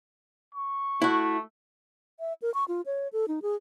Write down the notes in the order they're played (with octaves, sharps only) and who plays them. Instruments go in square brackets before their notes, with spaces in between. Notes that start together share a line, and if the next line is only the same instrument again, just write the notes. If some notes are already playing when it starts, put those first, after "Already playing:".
[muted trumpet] C#6
[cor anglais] A3 [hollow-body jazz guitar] E4 F#4
[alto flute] E5
A#4
C#6
F4
C#5
A4
D#4
G#4